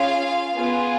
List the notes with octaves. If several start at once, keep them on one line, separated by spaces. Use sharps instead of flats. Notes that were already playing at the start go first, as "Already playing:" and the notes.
Already playing: C#4 F4 G#4 F5
B3 F4 G#4